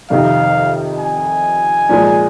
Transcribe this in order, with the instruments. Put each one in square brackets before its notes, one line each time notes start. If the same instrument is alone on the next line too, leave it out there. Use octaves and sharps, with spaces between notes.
[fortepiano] F2 C3 D#3 [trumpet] F5
[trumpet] G#5
[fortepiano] A#2 F3 G#3